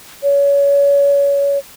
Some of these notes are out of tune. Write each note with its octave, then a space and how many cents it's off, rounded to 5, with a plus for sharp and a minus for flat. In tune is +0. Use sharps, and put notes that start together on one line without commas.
C#5 +25